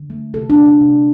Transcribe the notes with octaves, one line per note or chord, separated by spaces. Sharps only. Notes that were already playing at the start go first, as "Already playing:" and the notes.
Already playing: D3
A3
C3 A4
D4
C3
D4
C3